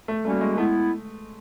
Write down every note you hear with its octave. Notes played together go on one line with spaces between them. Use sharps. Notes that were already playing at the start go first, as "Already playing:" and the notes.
A3
G3 A3 A#3 C#4 F#4
G#3
G#3 A3 B3 E4